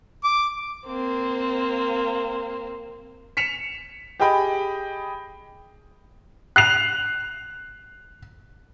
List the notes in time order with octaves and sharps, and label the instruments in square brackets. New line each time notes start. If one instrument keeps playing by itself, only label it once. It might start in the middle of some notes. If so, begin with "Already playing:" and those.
[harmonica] D6
[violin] A#3 C4
[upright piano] B6 C#7 E7 F7
G4 G#4 D#5 G5 B5
F#6 C7 F7